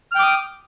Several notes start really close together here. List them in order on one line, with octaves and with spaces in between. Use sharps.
F6 G5 D6 D#6